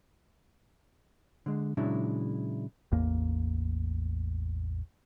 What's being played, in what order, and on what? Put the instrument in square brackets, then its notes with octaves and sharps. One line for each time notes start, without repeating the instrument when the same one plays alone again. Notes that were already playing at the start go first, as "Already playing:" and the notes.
[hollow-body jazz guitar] D3 G#3
A#2 C#3 F#3 G#3 D4 E4
[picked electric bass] A1 E2 A#3